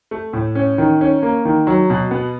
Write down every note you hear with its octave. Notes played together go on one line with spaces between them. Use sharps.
A3
A2
C#4
D#3
C#4
A#3
D#3
F#3
B2
B3